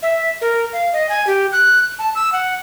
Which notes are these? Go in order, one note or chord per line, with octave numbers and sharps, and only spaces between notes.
E5
A#4
F5
D#5
G#5
G4
F#6
A5
E6
F#5